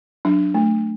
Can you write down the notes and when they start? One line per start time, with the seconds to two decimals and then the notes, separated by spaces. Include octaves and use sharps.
0.25 F#3 D4
0.54 A3